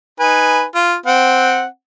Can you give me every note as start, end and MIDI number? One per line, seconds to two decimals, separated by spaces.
0.20 0.64 63
0.20 0.64 71
0.20 0.64 80
0.75 0.95 65
1.06 1.64 60
1.06 1.64 78